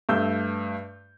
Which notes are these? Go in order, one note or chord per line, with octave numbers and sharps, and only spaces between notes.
G2 A3 E6 G6